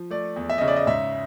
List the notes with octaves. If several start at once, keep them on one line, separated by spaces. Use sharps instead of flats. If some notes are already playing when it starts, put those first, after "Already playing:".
Already playing: F3
A3 D5
E2
E5
C#3 D#5
D5
D#5
G#2 E5